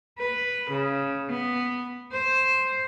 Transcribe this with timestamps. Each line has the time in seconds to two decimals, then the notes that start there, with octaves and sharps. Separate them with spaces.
0.19 B4
0.71 C#3
1.30 B3
2.12 C5